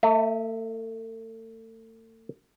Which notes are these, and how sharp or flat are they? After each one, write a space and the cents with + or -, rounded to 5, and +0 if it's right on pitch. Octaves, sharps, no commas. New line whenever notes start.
A3 +40 E5 -20